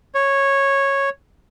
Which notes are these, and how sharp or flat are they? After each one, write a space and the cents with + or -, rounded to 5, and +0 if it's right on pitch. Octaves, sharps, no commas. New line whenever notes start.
C#5 -10